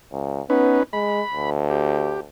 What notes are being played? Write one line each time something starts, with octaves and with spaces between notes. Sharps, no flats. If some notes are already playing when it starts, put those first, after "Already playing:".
C#2
B3 C#4 D#4 B4
G#3 B5
D2
G4